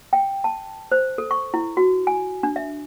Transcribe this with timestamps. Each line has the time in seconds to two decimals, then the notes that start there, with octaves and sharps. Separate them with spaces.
0.13 G5
0.44 A5
0.92 C5
1.18 A4
1.31 C#6
1.54 E4
1.77 F#4
2.07 G#5
2.43 D4
2.56 E5